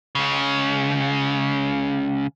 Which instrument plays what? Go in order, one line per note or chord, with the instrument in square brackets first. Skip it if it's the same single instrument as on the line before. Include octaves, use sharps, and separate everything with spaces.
[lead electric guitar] C#2 C#3